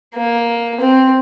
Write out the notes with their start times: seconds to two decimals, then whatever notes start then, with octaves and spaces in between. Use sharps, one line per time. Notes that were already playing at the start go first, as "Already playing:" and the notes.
0.15 A#3
0.80 C4